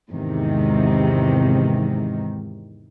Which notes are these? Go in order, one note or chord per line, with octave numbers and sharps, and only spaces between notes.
E2 G#2 C3 D#3